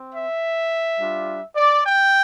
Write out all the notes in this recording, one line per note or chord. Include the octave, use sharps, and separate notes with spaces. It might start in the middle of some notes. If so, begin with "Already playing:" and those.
Already playing: C4
E5
G3 D4 F4
D5
G5